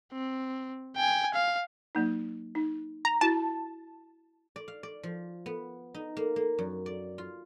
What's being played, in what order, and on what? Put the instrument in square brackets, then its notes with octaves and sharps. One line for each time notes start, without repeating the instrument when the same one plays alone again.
[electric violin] C4
G5 G#5
F5
[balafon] F#3 A#3 D#4
D#4
[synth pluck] A#5
[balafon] E4 F#4 [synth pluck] A5
[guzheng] D5
F5
D5
F3
B3
D#4
A#3
A#3
F#2
D5
F4